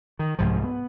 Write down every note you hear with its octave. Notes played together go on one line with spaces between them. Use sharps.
D#3
C2 G#2 F3
B3